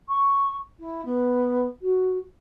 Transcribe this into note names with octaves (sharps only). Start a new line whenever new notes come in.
C#6
E4
B3
F#4